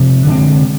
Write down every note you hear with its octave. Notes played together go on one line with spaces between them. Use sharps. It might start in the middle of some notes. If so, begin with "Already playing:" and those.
Already playing: C3 F3 G#3
D3 G#3 C4